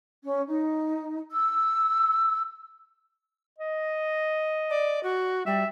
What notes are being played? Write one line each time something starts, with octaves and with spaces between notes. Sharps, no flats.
C#4
D#4
E6
D#5
D5
F#4
G3 E5